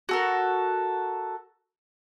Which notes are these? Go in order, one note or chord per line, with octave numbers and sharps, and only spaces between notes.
F#4 A4 A#4